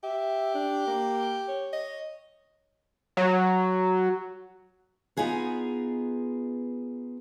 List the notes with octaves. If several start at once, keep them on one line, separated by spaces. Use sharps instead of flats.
G4 E5
D4
A#3
C#5
D#5
F#3
B3 D#4 F4 G#4 B4